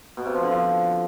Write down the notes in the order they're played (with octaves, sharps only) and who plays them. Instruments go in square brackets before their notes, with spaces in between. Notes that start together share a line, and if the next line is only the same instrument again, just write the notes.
[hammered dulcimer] B2
C3
F3
D3
F3